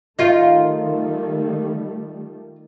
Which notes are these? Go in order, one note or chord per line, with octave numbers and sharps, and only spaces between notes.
D#3 G3 A3 D#4 F4